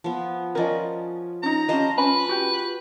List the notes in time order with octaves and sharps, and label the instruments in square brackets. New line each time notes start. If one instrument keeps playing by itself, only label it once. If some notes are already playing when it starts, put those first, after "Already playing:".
[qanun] F3 B3
[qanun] F3 C#4 [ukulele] A#4 D5 D#5
[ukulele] C#4 D#4 [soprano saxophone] A#5
[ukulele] C#4 G4 D#5 [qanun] F4 C5 A5
[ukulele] C#4 G#5 B5 [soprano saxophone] B4
[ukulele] F#4 G4